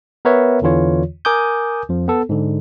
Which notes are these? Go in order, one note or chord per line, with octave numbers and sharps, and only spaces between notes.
B3 A#4 B4 C#5 E5
E2 D3 E3 F4 C#5
A#4 G#5 D6 D#6 G6
F2 F3
B3 A4
G#2 D3